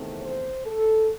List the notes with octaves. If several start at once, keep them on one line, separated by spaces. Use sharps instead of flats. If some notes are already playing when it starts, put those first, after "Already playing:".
Already playing: E2 C3 D#3 A3 C4
C5
A4